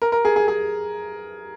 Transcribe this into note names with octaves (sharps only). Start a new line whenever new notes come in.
A#4
A#4
G#4
G#4
G#4